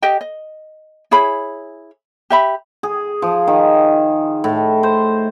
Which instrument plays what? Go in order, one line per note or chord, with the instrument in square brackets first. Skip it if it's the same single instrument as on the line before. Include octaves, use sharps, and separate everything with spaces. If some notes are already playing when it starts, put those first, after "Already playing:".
[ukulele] G4 D#5 G5
D#5
E4 G#4 C#5 B5
G4 E5 B5
[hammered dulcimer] G#4
F3
D#3
A2
C5